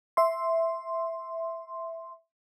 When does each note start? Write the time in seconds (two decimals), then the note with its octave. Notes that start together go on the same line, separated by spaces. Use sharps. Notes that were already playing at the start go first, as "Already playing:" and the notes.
0.17 E5 C6